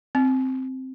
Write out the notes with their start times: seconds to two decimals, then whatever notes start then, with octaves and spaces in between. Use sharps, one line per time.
0.15 C4